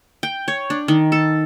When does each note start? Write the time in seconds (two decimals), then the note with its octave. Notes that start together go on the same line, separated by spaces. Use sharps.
0.23 G5
0.48 C#5
0.70 D4
0.88 D#3
1.12 A4